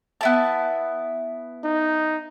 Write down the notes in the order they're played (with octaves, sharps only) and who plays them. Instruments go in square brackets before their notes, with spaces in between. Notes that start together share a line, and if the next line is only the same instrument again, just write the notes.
[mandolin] B3 E4 A5
[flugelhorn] D#4